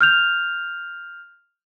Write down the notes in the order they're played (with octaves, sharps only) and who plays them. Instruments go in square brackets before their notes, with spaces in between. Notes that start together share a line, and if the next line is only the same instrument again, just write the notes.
[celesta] F6 G6 F7